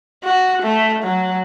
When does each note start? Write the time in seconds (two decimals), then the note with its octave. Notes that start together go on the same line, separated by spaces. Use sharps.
0.25 F#4
0.63 A3
1.04 F#3